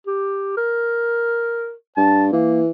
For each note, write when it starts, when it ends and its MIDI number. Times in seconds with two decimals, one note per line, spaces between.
0.07 0.56 67
0.57 1.73 70
1.97 2.28 43
1.97 2.25 81
2.32 2.71 52
2.32 2.61 58